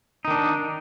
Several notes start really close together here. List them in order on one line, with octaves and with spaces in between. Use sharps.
D#4 D#3 D4